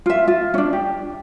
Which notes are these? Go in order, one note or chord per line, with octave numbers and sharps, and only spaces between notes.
F4 E5
F4
C#4 D4
G4